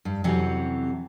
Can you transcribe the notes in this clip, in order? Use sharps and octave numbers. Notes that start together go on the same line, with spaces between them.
G2
F2 C3 E3 F#3 C#4